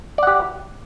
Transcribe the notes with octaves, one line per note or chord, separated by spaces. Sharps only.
G4 D5 F#5